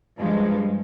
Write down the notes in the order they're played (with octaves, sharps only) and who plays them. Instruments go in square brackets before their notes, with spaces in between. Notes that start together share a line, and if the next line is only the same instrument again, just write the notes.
[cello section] G2 F3 G#3